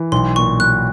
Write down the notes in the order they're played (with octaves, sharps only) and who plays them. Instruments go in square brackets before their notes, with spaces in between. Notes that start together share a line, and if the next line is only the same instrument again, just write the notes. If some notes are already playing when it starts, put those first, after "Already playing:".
Already playing: [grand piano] E3
[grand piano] B1 [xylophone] C6
[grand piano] A#2 [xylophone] C#6
[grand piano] F#3 [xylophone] F#6